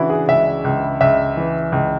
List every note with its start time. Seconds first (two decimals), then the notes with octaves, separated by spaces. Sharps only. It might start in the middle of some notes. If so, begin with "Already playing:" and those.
Already playing: C#3 E3 D4 E4 F#4
0.10 G#4
0.28 C#2 E5
0.64 C#2
1.01 C#2 E5
1.37 E3
1.72 C#2